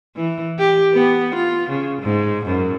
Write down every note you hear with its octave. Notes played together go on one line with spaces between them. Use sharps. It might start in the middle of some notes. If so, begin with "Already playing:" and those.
E3
G4
B3
F4
C#3
G#2
F#2